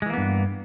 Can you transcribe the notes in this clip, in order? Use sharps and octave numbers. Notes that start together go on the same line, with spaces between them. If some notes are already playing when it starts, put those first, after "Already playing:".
G2 E3 G#3 A#3 B3